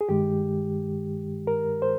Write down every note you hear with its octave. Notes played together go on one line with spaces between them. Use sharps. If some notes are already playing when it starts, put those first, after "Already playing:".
G#4
G2 D#3 G#3 G4
A#4
C5